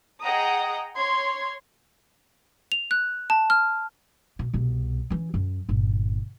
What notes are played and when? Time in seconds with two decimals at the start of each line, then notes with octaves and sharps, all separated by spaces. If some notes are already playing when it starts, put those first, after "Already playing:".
0.21 G#4 D#5 F#5 G5 A#5 D#6
0.96 C#5 C6 G#6
2.72 F7
2.91 F#6
3.30 A5
3.50 F6
4.39 B2
4.53 C2 B2
5.10 E3 C#4
5.34 F#2
5.69 G1 A#2